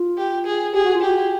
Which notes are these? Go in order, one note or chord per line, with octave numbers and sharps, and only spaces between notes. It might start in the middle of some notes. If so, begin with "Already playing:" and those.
Already playing: F4
G4
G#4
G4 G#4
F#4
F4
F#4 G4